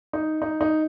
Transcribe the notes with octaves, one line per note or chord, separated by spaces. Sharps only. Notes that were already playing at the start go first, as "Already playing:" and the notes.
D#4
D#4
D#4